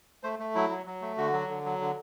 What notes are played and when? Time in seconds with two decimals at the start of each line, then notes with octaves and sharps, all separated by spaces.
0.23 A3 C5
0.39 A3
0.55 F#3 E4
0.70 F#3
0.86 F#3
1.02 A3
1.18 D3 F#4
1.33 F#3
1.49 D3
1.65 F#3
1.80 D3